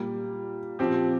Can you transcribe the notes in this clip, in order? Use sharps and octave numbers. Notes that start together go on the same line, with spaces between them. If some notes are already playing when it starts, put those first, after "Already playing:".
Already playing: A#2 G3 A#3
A#2 F3 C4 G4